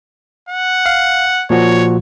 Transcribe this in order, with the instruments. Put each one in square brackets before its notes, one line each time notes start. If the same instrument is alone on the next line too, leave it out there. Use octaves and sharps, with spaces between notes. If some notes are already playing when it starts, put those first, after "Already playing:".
[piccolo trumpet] F#5
[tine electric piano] F5
[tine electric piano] A#2 F3 F#4 [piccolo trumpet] C#5